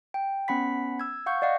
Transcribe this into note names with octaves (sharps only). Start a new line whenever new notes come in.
G5
B3 C#4 F#5 B5 B6
E6 G#6
F5 F#5 C#6 G6
D5 D#5 F5 F#5